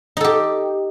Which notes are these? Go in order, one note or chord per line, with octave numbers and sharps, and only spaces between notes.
D#4 G4 A4